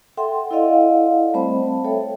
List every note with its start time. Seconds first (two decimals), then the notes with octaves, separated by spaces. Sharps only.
0.17 A4 E5 F#5 G5 C6
0.51 E4 A4 D5 D#5 F5 F#5
1.34 G3 A3 C4 C5 B5
1.84 A4 C#5 E5 G5